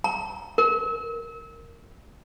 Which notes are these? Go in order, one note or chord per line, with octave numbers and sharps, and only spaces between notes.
A#5
A#4